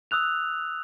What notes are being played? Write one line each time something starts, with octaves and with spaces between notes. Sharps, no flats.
D#6 E6 F#6 F7